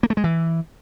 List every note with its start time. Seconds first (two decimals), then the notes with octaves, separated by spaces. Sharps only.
0.03 A#3
0.10 A3
0.17 G#3
0.24 E3